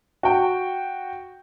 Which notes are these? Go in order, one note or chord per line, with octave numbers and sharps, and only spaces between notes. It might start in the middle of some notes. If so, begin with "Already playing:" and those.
F#4 G5